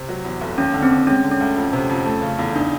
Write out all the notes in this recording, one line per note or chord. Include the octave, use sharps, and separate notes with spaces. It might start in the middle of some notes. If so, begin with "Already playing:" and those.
Already playing: C3
F#3
E2
F1
D#2 C#4
D3
C4
D#2
G#3 C#4
D3
C#4
D2
F2
C3
F2
A3
C#3
E2
D4 D#4